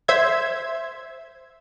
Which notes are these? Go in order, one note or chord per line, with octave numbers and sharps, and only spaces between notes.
C5 E5 G#6